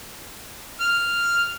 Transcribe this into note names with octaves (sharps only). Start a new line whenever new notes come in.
F6